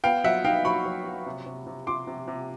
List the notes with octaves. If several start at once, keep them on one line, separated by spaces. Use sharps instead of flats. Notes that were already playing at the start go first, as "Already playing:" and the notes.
B3 F5 G5
F#3 E5 F#5
D#4 F5 G5
F#3 B5 C#6
F#3
F#3
C3
C3
C3
C3 C6 D6
C3
C3